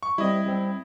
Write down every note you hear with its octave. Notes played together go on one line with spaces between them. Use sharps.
C#6
G3 C4 E4 D#5
G3 C4